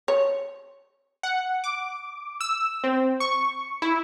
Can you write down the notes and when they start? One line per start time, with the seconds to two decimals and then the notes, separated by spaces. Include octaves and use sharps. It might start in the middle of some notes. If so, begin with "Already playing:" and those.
0.08 C#5
1.23 F#5
1.64 D6
2.41 E6
2.84 C4
3.20 C#6
3.82 E4